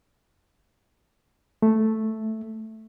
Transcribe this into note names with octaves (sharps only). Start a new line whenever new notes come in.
A3